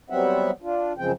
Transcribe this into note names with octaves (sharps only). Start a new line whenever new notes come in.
F#3 G3 B3 C4 E5 F#5
D4 F4
F#2 C#3 F3 G#3 C4 G5